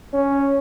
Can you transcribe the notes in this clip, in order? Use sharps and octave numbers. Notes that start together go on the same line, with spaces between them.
C#4